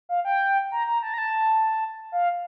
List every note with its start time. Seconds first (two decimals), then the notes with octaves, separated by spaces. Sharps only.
0.09 F5
0.25 G5
0.72 A#5
0.87 A#5
1.03 A5
1.14 A#5
1.18 A5
2.12 F5